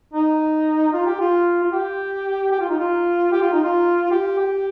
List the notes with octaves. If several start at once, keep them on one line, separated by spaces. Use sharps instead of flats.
D#4
F4
G4
F4
F4
G4
G4
F4
D#4
F4
G4
F4
D#4
F4
G4
G4